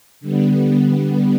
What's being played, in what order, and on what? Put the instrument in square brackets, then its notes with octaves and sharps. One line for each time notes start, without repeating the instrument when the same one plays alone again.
[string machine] D3 G3 B3